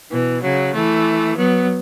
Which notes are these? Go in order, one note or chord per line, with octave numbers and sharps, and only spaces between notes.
B2 E3
C#3 F#3
E3 A3
F#3 B3